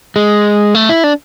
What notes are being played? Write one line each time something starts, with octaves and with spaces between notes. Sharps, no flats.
G#3
A3
E4
D4